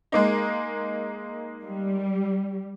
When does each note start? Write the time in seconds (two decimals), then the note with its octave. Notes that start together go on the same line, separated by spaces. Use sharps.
0.12 G#3 A#3 D#4
1.64 G3